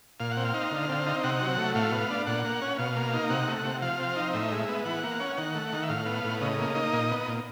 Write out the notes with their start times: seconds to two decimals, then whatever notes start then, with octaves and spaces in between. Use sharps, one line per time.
0.20 A#2 F5
0.31 F#5
0.37 C4
0.45 F5
0.54 D#4
0.71 D3
0.89 C4
1.06 D#4
1.24 C3 F#5
1.40 F#3
1.58 A3
1.75 A2 F5
1.92 B3
2.10 D4
2.26 A#2 F#5
2.44 A#3
2.62 C#4
2.78 B2 F5
2.96 A#3
3.14 D#4
3.30 C3 F#5
3.48 A3
3.65 C3
3.82 F3 F5
3.99 C4
4.16 D#4
4.33 A2 E5
4.52 G#3
4.69 B3
4.85 E3 F#5
5.04 A#3
5.20 C#4
5.37 D#3 F#5
5.55 A3
5.73 D#3
5.83 E5
5.89 A2 F5
6.06 B3
6.24 A2
6.41 C#3 D#5
6.59 A#3
6.75 D#4
6.93 A#2
7.11 B3
7.27 A#2